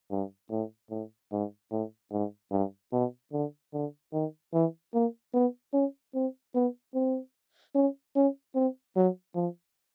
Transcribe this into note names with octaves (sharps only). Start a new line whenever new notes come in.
G2
A2
A2
G#2
A2
G#2
G2
B2
D3
D3
D#3
E3
A#3
B3
C#4
C4
B3
C4
C#4
C#4
C4
F#3
F3